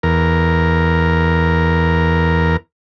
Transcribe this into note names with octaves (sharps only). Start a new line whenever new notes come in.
E2 A#4